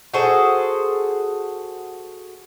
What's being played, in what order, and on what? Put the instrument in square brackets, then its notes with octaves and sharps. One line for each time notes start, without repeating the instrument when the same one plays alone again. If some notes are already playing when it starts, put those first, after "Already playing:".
[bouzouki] F#4 G#4 A4 C5